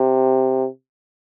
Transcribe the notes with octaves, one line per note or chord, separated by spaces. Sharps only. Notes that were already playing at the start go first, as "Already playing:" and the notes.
Already playing: C3